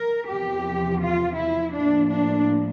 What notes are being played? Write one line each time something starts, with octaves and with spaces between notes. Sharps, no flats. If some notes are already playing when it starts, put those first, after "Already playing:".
Already playing: A#4
E2 C3 F3 G4
F4
E4
A2 F3 A#3 D4
D4